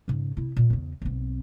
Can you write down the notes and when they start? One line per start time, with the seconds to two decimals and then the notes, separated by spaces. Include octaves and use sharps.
0.08 G#2 C#3
0.37 C3 E4
0.56 A#2
0.70 E2 C#3
1.02 B1 C4